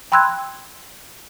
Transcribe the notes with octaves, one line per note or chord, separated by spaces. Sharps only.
G5 B5 C6 E6 F#6 G#6